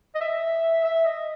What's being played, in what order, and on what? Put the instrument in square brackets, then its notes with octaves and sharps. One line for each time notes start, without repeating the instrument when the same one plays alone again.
[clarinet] D#5
E5
E5
D#5